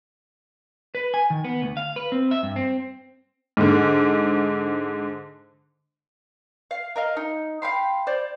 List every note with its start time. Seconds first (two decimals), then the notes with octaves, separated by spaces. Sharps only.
0.95 B4
1.14 G#5
1.30 D#3
1.44 B3
1.62 D2
1.77 F5
1.96 B4
2.12 C4
2.31 E5
2.43 G2
2.56 C4
3.57 G#2 D3
6.71 F5
6.96 A#4 D#5 F5
7.17 D#4
7.62 F5 G5 B5 C6
8.07 C5 D5